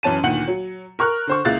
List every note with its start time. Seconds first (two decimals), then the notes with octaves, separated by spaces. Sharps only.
0.03 F#2 E3 C#4 A5 D#7
0.23 D2 A#2 D#3 F#5 C#7 F#7
0.48 F#3
0.99 A#4 C#6 F6 F#6
1.27 D3 C5 C#6
1.45 C#2 A#3 E4 F5 F#6 A6